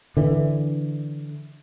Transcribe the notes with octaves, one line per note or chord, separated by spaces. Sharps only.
D3 E3